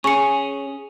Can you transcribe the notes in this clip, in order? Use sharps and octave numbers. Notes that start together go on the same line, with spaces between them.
C#4 G#4 C#6 C#7